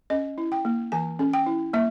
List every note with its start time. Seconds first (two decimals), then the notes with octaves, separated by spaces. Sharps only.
0.10 C#4 D#5
0.38 E4
0.52 G5
0.65 A#3
0.92 E3 G#5
1.19 C#4
1.33 G5
1.46 E4
1.73 A#3 E5